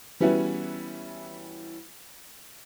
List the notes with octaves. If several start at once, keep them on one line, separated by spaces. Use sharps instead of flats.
E3 G3 B3 C#4 E4 F#4